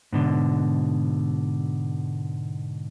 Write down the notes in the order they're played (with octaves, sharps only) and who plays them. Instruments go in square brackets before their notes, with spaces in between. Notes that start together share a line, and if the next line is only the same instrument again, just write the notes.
[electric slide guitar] G#2 B2 D3